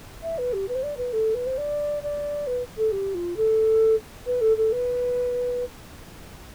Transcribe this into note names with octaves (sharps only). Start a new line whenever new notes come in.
E5
B4
G4
B4
C5
D5
B4
A4
B4
C5
D5
D5
B4
A4
G4
F4
A4
B4
A4
A4
B4